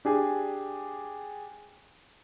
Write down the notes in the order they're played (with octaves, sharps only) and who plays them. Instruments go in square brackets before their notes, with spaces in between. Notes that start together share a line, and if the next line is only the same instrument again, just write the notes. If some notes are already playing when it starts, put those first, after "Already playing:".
[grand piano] D4 G4 G#4